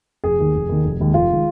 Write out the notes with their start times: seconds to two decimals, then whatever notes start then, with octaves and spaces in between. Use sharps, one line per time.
0.24 F1 G#4
0.39 D#2 D#3
0.54 F1
0.69 D#2 D#3
0.84 F1
1.00 D#2 D#3 G#3
1.14 F1 F4
1.31 D#3 G#3